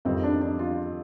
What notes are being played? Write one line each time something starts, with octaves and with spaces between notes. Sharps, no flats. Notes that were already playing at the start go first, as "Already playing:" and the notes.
F2 D#3 G3 C4
D#4
D4
D4
F4